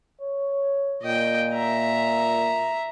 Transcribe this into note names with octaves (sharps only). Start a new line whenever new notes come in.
C#5
A#2 D#5 G5
E5 A#5